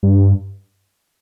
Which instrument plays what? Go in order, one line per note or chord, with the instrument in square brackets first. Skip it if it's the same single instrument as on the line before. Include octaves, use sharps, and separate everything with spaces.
[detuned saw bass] G2